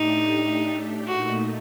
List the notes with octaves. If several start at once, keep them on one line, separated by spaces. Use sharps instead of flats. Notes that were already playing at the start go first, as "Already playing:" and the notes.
Already playing: A2 A3 D4 D#4 G4
A#2 A3 D#4 F#4